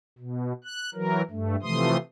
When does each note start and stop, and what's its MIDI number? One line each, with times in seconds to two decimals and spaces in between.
0.19 0.53 47
0.64 0.90 90
0.94 1.22 52
0.94 1.22 54
0.94 1.22 70
1.31 1.56 43
1.31 1.56 57
1.62 1.97 48
1.62 1.97 52
1.62 1.97 53
1.62 1.97 57
1.62 1.97 84
1.62 1.97 87